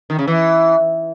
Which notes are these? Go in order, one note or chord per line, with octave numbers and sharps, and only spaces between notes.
D#3
C#3
E3